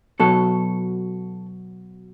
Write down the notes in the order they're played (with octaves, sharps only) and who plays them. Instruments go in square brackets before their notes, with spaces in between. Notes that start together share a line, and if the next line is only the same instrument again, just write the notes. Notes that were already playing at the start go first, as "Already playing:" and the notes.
[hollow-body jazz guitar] B2 F#3 A4